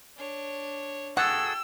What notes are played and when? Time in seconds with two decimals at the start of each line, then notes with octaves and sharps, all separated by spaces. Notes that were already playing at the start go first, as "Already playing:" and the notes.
0.18 D4 C#5
1.17 F#4 G#4 A4 F#5 G5 E6